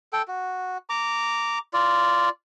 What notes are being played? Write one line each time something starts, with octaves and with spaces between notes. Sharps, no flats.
A4 G5
F#4
A#5 D6
F4 D5